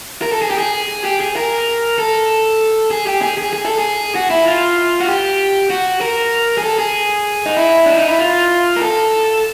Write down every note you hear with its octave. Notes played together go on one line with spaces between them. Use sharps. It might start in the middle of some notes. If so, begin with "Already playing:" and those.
A#4
A4
G#4
G4
G#4
G4
G#4
A#4
A4
G#4
G4
G#4
G#4
G#4
A4
G#4
F#4
E4
F4
F#4
G4
F#4
A#4
G#4
A4
G#4
D#4
E4
D4
D#4
E4
F4
A#4
A4